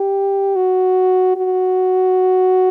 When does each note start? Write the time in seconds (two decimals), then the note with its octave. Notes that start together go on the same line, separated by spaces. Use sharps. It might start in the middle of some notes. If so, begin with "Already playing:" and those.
Already playing: G4
0.56 F#4
1.36 F#4